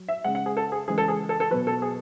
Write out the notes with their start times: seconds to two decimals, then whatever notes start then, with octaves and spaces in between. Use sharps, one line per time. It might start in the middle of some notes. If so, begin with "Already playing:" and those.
Already playing: F#3
0.08 E5
0.24 C#3 G#3 F#5
0.35 F#5
0.46 G#4
0.57 A4
0.72 G#4
0.88 C#3 E3 G#3 G#4
0.98 A4
1.08 G#4
1.29 A4
1.40 A4
1.51 B2 F#3 B4
1.67 A4
1.82 G#4